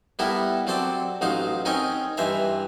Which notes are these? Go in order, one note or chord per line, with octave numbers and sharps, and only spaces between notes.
G3 B3 E4 A4 A#4
F#3 C4 A4 C5 D5
A1 F#3 D#4 C5 F5
C4 C#4 D#4 A#4 C#5 D#5
G2 E3 C5 E5 A#5